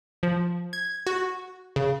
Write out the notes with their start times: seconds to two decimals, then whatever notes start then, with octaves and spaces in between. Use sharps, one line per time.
0.23 F3
0.73 G#6
1.07 F#4
1.76 C#3